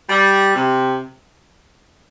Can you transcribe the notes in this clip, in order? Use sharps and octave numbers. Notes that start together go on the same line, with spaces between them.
G3
C3